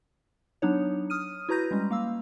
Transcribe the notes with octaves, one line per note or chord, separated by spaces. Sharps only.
F#3 B3 D4 D#4 C#5
D#6 F6 D#7
E4 F#4 B4 A#5 G6 A#6
G3 G#3 C#4
A#3 F5 E6